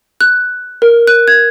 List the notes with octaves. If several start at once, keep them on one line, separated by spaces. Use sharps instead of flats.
F#6
A#4
F#6
G#6